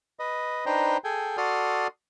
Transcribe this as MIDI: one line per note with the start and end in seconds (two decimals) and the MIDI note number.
0.19 0.65 71
0.19 0.65 75
0.66 0.97 62
0.66 0.97 63
0.66 0.97 71
0.66 0.97 72
0.66 0.97 79
0.66 0.97 82
1.04 1.37 68
1.04 1.37 69
1.04 1.37 79
1.04 1.37 80
1.37 1.87 66
1.37 1.87 69
1.37 1.87 74
1.37 1.87 84
1.37 1.87 87
1.37 1.87 89